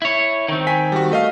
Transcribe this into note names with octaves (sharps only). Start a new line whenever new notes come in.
E4 C#5
D#3 C4
G5 G#5 B6
G3 F#4
A3 D#5 F5